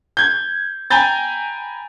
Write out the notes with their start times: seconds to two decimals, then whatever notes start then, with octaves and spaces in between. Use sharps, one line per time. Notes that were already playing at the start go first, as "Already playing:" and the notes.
0.17 G6 G#6
0.90 G5 G#5 A#5 B5 G6 A6